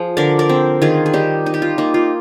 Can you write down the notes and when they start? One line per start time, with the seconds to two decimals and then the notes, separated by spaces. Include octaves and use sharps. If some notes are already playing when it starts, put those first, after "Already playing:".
Already playing: F3 G#4
0.17 D3 A#4 D5
0.39 A#4 D5
0.49 C4
0.82 D#3 F4 G#4
1.06 G#4
1.13 G3 D#4 G4
1.46 D#4
1.54 G4
1.62 F4
1.78 A#3 D#4
1.94 F4